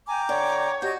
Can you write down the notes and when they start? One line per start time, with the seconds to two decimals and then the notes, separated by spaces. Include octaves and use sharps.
0.07 G5 G#5 A#5 D6
0.29 D3 C#5
0.82 F#4 G4 D#5 G6